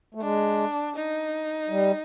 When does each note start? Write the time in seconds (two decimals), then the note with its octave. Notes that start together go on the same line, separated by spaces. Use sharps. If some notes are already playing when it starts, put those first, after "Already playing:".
0.15 A3
0.20 G#3 D4
0.96 D#4
1.69 G3